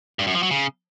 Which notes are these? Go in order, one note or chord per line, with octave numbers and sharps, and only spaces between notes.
G2
F#2
F3
F#3
C#3